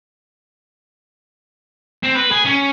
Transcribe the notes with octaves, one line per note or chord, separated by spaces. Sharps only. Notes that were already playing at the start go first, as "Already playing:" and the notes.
C4
B4
G#4
C#4